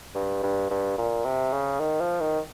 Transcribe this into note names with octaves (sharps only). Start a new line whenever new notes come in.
G2
G2
G2
A#2
C3
C#3
D#3
F3
D#3